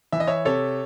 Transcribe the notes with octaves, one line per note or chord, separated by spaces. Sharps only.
E3 E5
D#5
C#5 E5
C3 A4 C#5